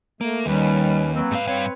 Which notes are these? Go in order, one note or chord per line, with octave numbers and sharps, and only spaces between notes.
A3 A#3
D#2 D#3 G3 C#4 B4
F#3 A#3 C4 B4
G#2 F5
G2 C4 C#5 F5